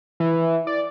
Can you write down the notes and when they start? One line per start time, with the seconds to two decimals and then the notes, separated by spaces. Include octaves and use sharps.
0.20 E3
0.67 D5